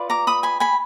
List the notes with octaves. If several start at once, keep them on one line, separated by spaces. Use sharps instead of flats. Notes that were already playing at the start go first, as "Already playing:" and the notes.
Already playing: F4 B4 D5
A#5 D6
B5 D#6
G#5 B5
G#5 B5